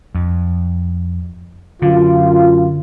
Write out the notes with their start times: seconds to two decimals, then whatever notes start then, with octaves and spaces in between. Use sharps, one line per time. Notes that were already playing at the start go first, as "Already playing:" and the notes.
0.15 F2
1.82 F#2 D3 F4